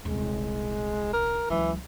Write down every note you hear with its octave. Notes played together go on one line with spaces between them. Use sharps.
D#1 C2 G#3
A#4
C#2 E3 F#3